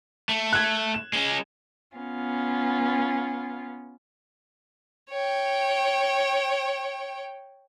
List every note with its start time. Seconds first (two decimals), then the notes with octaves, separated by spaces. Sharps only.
0.29 A3
0.53 F#6 G#6
0.94 E7
1.13 G#3 C#4
1.98 B3 C#4 F4
5.10 C#5 G5